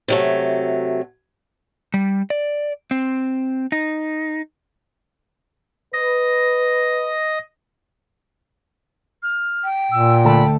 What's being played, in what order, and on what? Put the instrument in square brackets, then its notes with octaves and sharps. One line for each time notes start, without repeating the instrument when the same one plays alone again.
[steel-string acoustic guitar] C3 F#3 A3
[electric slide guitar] G3
D5
C4
D#4
[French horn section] B4 [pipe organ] D#5 A#6
[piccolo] F6
[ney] G5
[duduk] A#2 [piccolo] E6
[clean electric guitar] D2 A4 [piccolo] B5